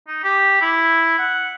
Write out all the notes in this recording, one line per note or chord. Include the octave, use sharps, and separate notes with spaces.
D#4
G4
E4
F#5